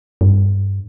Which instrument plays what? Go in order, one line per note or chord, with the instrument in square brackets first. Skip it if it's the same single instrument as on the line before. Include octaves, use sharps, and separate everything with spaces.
[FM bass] G2